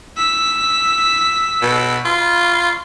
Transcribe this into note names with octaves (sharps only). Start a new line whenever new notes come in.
E6 B6
B2
F4